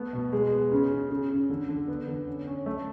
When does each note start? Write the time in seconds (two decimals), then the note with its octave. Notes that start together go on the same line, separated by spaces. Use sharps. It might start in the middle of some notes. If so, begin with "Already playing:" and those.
Already playing: A3 B3
0.13 B2
0.33 G#3
0.52 B3
0.72 C#3
0.91 C#3
1.10 C#3
1.30 C#3
1.50 D3
1.69 D3
1.88 B3
2.08 D3
2.27 C#4
2.47 C#4
2.66 A3